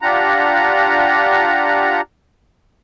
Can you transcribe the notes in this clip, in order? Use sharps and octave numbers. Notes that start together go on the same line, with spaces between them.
D4 F4 G4 F#5 A#5